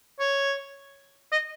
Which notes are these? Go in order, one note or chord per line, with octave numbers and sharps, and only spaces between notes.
C#5
D#5